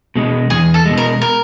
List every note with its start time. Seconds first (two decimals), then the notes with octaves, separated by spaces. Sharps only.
0.15 B2 G#3
0.50 E2 G#4
0.74 A4
0.86 B2 G#3
0.98 A#4
1.22 A#4